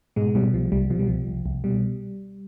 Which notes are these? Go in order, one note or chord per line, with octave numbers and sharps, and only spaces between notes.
G#2 B2 G#3
B2 G3
C2 F3
C2 G3
B2 F3
G3
C2 F3
C2
C2
B2 G3